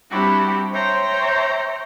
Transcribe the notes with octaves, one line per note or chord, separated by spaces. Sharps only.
G3 C4 D4 E4 F#4 G4
C5 C#5 E5 G5 A#5 C6